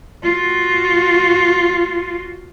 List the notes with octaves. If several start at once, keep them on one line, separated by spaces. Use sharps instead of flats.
F4 F#4